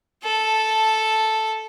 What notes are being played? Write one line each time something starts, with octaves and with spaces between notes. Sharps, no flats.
A4 A5